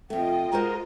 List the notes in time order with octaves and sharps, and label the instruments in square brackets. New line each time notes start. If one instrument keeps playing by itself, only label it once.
[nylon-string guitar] F2 A3 [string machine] F4 D#5 [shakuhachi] G5
[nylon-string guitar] G#3 F#4 C5 [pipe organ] A#4